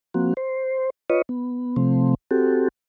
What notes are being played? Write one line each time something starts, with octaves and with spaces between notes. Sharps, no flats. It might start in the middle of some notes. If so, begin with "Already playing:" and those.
F3 A#3 C4 F#4
C5
F4 B4 C#5 D#5
B3
C3 F3 A3 C4
C4 F#4 G4 A4